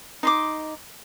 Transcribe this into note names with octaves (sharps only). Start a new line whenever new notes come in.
D#4 C6 D6